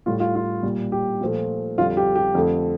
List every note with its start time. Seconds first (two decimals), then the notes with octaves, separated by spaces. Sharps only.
0.06 A2 G3 F4
0.20 F4
0.35 F4
0.63 A#2 G3
0.92 G4
1.21 A#2 F3 A3
1.77 F2 D3 G3 F4
1.97 G4
2.15 G4
2.35 F2 D3 A3